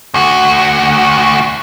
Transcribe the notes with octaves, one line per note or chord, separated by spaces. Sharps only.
D2 F#4